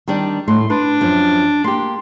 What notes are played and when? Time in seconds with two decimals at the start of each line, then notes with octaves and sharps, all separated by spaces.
0.08 D#3 G3 D4
0.48 A2 A3 C6
0.70 D4 B4
1.01 F#2 F3
1.64 A#3 G4 C6